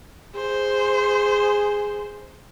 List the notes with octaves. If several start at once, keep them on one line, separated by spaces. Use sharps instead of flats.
G#4 C5